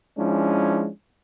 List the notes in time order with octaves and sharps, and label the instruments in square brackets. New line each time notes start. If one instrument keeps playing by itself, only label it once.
[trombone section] F3 G#3 C#4 D4 E4